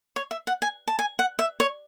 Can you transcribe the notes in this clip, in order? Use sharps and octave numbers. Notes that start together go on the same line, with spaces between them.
C#5
E5
F#5
G#5
A5
G#5
F#5
E5
C#5